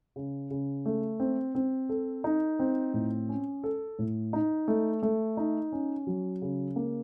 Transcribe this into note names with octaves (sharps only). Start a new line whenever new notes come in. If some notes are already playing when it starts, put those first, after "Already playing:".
C#3
C#3
A3
C4
C4
A4
D#4
C4
A2
C#4
A4
A2
D#4
A3
A3
D#4
C#4
F#3
C#3
A#3